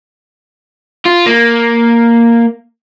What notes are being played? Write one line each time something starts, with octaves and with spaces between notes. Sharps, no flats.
F4
A#3